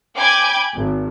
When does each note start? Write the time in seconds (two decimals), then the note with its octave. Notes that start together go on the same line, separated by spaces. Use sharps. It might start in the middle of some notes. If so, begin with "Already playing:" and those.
0.17 G5 G#5 B5 D6 G6 G#6
0.74 G#1